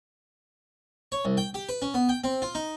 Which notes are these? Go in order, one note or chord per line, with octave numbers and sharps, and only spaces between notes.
C#5
C2
G5
G4
B4
C#4
B3
G5
C4
F4
D#4